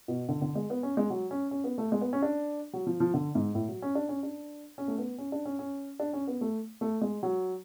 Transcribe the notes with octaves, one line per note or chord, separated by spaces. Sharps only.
B2
D3
D3
G#3
B3
C#4
G#3
F#3
C#4
C#4
B3
A3
G#3
B3
C#4
D4
F#3
F3
F3
D3
G#2
A2
F#3
C#4
D4
C#4
D4
C#4
A3
B3
C#4
D4
C#4
C#4
D4
C#4
B3
A3
A3
G#3
F#3